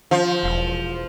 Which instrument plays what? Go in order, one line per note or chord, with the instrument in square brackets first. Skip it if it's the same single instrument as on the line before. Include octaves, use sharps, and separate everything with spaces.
[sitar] F3
[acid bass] E1